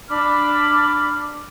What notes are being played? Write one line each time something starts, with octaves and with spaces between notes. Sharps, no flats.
D4 B5 D6 F6